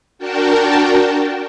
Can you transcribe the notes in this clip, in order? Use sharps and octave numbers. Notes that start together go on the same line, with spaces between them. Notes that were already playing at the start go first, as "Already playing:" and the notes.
D4 F#4 A#4 G5 A5